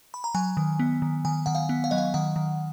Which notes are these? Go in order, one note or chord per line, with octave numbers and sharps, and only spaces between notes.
B5
A#5
F#3 G#5
D#3
B3
D#3
D#3 G#5
D#3 F#5
F5
B3
F5
F#3 D#5
F5
D#3 F#5
D#3